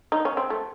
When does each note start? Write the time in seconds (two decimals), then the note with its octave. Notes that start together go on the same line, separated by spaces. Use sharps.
0.12 D#4
0.25 C#4
0.37 C4
0.50 A3